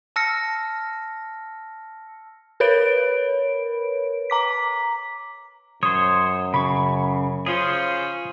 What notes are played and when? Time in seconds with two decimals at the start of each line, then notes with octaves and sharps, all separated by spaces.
0.16 A5 E6 F6 A#6 C#7
2.60 A#4 B4 C#5 B5 D7
4.30 A#5 D6 B6
5.83 F#2 C5 C#5 D#6
6.54 C#3 B5 C#6
7.46 F3 C#4 F4 G#4 C5